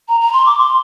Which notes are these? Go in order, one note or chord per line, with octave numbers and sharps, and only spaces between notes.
A#5
A#5
C6
D6
C6